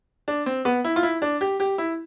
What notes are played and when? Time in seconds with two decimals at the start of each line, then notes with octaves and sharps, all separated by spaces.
0.28 D4
0.46 C4
0.65 B3
0.85 E4
0.96 F4
1.03 E4
1.22 D4
1.41 G4
1.60 G4
1.78 E4